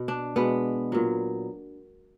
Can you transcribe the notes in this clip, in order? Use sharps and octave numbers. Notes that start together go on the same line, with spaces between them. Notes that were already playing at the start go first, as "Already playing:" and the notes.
Already playing: B2
D4
B2 G#3 B3
A#2 F#3